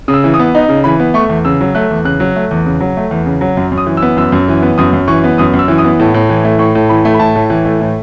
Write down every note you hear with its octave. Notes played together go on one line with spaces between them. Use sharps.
C#3 D#6
E6
E3
D#6
B3
D#4
C#3
E3 B5
B3
A3 C#6
E2
C#3 E6
F#3
A3 F#6
E2
C#3 F#6
F#3
A3
E2
C#3
F#3
A3
E2
C#3
F#3
F#2
F#2
D#6
E3
E6
B3
F#2 E6
F#2
E3
B3
F#2 D#6
F#2
E3 C#6
B3
F#2 D#6
F#2
E6
E3
D#6
B3
A2
A2
E3
A3
A2 C#6
A2
E3 B5
A3
B5
A2 A5
A2
E3
A3
A2